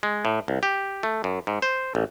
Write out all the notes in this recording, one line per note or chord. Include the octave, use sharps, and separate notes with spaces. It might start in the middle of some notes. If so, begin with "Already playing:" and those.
G#3
A2
C2
G4
A3
F#2
G#2
C5
A1